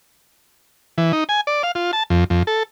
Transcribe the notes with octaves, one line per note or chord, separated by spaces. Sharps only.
E3
D#4
G#5
D5
F5
F4
A5
F2
F2
A4